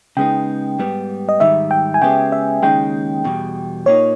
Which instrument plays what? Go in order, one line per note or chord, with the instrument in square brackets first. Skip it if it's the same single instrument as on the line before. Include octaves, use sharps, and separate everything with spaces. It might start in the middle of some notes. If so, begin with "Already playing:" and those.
[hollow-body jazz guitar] C#3 G#3 B3 D#4 [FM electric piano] G5
[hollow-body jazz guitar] G#2 G3 B3
[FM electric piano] D#5
[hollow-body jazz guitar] G#2 D#3 G3 [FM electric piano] E5
[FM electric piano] G5
G#5
[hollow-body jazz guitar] C#3 G#3 B3 G4 [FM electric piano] G5
[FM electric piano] E5
[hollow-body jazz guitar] D#2 C#3 G#3 D#4 [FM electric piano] G5
[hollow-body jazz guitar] E2 B2 G3
[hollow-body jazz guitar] A#2 A#3 D#4 [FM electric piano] C#5